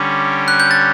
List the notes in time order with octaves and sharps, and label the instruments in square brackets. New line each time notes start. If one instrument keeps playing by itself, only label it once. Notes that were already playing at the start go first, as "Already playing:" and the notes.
Already playing: [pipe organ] D3 G3 C#4 [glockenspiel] D6
[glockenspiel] F#6
G6
A6